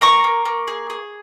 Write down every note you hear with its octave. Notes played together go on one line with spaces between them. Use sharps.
A#3 A#5 C#6
A#3
A#3
G#4
G#4